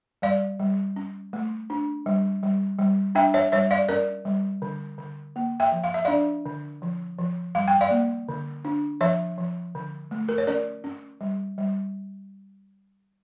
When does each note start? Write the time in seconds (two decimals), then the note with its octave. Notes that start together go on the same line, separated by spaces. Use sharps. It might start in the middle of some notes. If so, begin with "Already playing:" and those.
0.22 G3 D5 F5
0.60 G3
0.96 C#4
1.33 A3
1.70 D4
2.06 G3
2.43 G3
2.79 G3
3.15 D4 E5 G5
3.34 C#5 E5
3.52 G3 C#5 E5
3.71 D5 F5
3.89 C#4 A#4 D5
4.25 G3
4.62 D3
4.98 D3
5.36 A#3
5.60 E5 G5
5.72 F3
5.84 F5
5.94 E5
6.05 D4 D5 F5
6.46 D3
6.82 F3
7.18 F3
7.55 G3 F5
7.68 G5
7.81 D5 F5
7.91 A#3
8.29 D3
8.65 D4
9.01 F3 C#5 E5
9.38 F3
9.75 D3
10.11 A3
10.29 A#4
10.38 C#5
10.47 C#4 A#4 D5
10.84 C#4
11.21 G3
11.58 G3